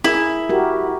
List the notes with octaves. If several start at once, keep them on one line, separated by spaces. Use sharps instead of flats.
E4 G#4 A#4
F#4 G4 A#4